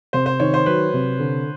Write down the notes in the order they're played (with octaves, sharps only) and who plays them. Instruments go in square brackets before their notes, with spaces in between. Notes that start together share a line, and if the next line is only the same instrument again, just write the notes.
[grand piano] C3 [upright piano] C5
[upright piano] C5
[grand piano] D#3 [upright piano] C#5
[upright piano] C5
[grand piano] F#3 [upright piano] B4
[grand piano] C3
D3